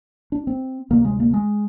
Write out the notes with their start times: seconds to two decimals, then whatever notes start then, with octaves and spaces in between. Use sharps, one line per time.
0.32 D4
0.47 C4
0.90 D2 C3 A#3
1.05 G#3
1.20 A#3
1.33 G#3